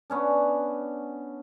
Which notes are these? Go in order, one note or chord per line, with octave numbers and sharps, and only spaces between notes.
B3 C#4 D4